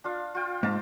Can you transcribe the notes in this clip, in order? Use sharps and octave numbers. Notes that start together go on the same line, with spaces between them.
D4 F4 F5
F4 G5
G#2 F5 A5 A#5